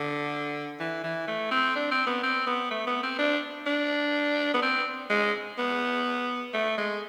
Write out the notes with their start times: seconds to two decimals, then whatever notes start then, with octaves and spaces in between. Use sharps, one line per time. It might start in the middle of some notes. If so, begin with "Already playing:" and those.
Already playing: D3
0.80 E3
1.04 E3
1.28 A3
1.51 C4
1.76 D4
1.92 C4
2.07 B3
2.23 C4
2.47 B3
2.71 A3
2.87 B3
3.03 C4
3.19 D4
3.67 D4
4.54 B3
4.62 C4
5.10 G#3
5.58 B3
6.54 A3
6.78 G#3